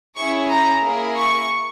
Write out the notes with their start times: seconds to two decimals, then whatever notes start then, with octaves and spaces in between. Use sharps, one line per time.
0.16 C#4 E4 G#4 C#6
0.49 A#5
0.83 A#3 E4 G#4
1.16 C#6